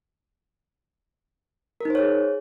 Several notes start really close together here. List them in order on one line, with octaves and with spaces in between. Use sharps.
A#4 D#4 C5 C#5 G#4